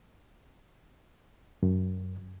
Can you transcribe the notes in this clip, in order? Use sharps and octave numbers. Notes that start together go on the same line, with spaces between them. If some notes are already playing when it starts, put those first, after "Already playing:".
F#2